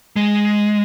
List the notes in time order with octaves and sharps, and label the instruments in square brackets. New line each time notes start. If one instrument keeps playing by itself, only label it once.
[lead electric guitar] G#3